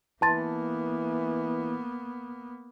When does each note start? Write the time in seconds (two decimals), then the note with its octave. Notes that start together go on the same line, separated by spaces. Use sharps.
0.22 E3 A#3 B3 A5 C6 A6